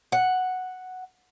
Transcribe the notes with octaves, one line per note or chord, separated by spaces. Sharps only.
F#5